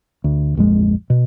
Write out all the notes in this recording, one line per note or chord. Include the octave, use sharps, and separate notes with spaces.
D2
D1 A#1 F2 G#3
B2